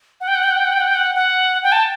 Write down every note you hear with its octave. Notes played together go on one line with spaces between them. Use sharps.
F#5
G5
F#5
G5
F#5
G5
F#5
G5
F#5
G5
F#5
F#5
G5
A5